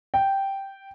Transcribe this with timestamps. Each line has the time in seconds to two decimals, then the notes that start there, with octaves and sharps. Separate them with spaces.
0.14 G5